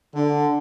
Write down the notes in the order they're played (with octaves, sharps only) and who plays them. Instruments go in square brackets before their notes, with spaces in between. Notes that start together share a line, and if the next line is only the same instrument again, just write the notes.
[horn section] D3